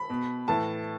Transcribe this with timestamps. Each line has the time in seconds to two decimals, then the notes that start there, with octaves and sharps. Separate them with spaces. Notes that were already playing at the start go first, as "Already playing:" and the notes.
Already playing: B5
0.10 B2
0.48 A2 E3 A5